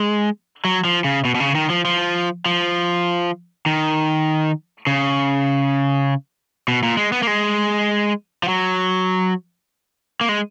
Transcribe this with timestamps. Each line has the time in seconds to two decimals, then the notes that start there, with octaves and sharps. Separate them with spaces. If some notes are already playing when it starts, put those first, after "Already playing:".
Already playing: G#3
0.65 F#3
0.85 F3
1.04 C#3
1.25 B2
1.35 B2
1.40 C#3
1.55 D#3
1.70 F3
1.85 F3
2.46 F3
3.66 D#3
4.87 C#3
6.68 B2
6.83 A#2
6.97 G#3
7.12 B3
7.23 A#3
7.27 G#3
8.43 F3
8.48 F#3
10.21 A#3
10.29 G#3